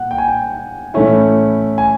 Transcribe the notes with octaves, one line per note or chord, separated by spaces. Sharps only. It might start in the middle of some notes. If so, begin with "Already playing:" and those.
Already playing: A#2 F#5
G5
G#5
G5
A2 E3 A3 C#4 E4
G#5